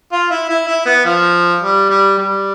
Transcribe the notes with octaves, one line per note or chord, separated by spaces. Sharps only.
F4
E4
E4
E4
B3
F3
G3
G3
G3